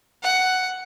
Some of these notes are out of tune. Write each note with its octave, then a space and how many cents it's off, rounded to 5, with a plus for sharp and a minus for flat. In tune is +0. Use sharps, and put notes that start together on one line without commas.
F#5 +5